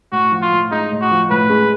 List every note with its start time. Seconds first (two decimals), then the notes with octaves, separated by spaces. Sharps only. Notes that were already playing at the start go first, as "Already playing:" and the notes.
0.12 A2 F#4
0.32 F3
0.42 F4
0.51 A2
0.71 G#3 D#4
0.92 A2
1.01 F#4
1.11 F3
1.30 A2 B4
1.50 G#3